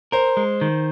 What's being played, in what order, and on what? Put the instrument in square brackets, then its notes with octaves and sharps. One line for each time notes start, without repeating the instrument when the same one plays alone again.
[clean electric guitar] A#4 [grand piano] C5
[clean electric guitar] G#3
D#3